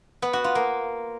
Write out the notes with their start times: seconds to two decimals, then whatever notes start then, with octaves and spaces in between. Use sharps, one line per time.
0.22 B3
0.33 F#4
0.44 F4
0.55 A#3